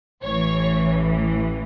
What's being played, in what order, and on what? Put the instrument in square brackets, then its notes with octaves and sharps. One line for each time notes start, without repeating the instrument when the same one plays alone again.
[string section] A1 A2 E3 C#5